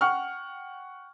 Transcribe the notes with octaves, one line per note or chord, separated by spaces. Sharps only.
F#5 G5 C#6 F6